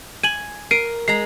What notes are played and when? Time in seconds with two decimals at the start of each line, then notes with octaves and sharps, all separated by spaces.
0.23 G#5 D#7 F#7
0.71 A#4 C7 D7 D#7
1.08 G#3 A#5 C7